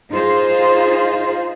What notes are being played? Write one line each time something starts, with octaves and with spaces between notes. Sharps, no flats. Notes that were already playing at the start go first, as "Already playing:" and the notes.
D#4 F4 G#4 C5